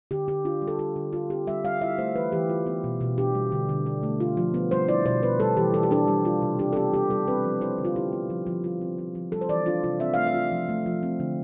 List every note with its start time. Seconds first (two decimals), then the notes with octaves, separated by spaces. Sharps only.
0.11 D3 G4
0.28 D3 G4
0.45 D4 F4
0.62 G3
0.68 A4
0.79 F4 G4
0.96 D3
1.13 F4
1.30 C4 G4
1.47 G3 E5
1.65 G3 F5
1.81 E4 E5
1.98 A3 C5
2.15 E3 B4
2.32 E3 G4
2.49 F4
2.67 B3
2.84 B2
3.01 B2
3.18 D4 G4
3.35 G3
3.52 D3
3.69 D3
3.86 D4
4.03 A3
4.20 F4
4.37 F3
4.54 B3
4.71 G3 C5
4.88 E4 D5
5.05 B2 C5
5.23 B3 B4
5.40 G3 A4
5.57 E3 G4
5.74 E3 A4
5.83 G4
5.91 D4 A4
6.08 G3
6.25 F4
6.42 C3
6.59 D4 G4
6.73 A4
6.76 B3 G4
6.93 G3 G4
7.10 G3 A4
7.27 C4 B4
7.45 F3
7.61 E4 C5
7.78 D3
7.85 F4
7.96 E4 G4
8.13 B3
8.30 F3
8.47 F3
8.64 F4
8.81 C4
8.98 F3
9.15 F3
9.32 G3 A4
9.41 C5
9.49 E3 D5
9.66 D4 F4
9.83 C3 F4
10.00 C4 E5
10.14 A3 F5
10.27 E5
10.34 F4
10.52 F3
10.69 A3
10.86 F3
11.03 C4
11.20 D3